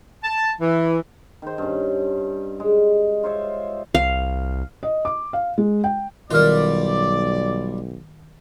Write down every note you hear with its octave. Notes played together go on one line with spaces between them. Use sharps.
A5
E3
D#3 C5
G2 C#4
G#3
F4 C5 C#5 E5
C2 F5
D#5
D6
F5
G#3
G5
B1 D#3 G3 F4 A#4 D5 F6